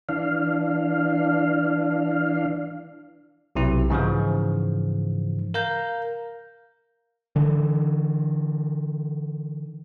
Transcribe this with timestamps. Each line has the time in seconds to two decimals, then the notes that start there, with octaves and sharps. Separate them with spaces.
0.09 E3 D4 F5
3.55 B1 C3 E4
3.90 G#2 C#3 E3 F3
5.54 A#4 F5 A#5 G6
7.36 D3 E3